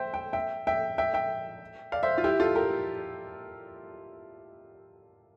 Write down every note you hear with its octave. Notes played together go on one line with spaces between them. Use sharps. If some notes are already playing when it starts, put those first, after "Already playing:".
Already playing: C5 E5 G5
G5
E5 G5
E5 G5
E5 G5
E5 G5
D5 F5
C5 E5
F4
E4 G4
F4 A4
G4 A#4